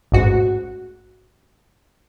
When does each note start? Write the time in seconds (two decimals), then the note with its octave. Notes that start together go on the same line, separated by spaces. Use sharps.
0.12 A1 G#2 F#4